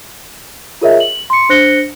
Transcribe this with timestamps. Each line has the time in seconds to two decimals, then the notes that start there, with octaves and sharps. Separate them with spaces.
0.81 F4 G#4 A#4 C#5 D#5 E5
1.00 F#7
1.30 C6 C#7
1.49 D4 C5 F#6 A#6 C#7 G7